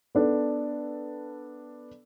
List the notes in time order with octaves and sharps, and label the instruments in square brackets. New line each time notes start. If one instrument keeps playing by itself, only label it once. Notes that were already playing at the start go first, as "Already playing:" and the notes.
[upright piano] B3 D4 A4